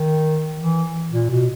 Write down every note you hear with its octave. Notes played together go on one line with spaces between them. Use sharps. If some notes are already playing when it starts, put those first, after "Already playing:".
Already playing: D#3
E3
A#2
B2